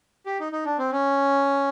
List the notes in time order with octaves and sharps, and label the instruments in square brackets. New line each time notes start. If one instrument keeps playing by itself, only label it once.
[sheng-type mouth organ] G4
D#4
D#4
D4
C4
C#4